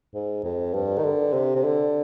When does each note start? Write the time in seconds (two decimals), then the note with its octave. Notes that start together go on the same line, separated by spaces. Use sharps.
0.14 G#2
0.44 F2
0.74 G2
0.98 D#3
1.04 D3
1.33 C3
1.55 C3
1.64 D3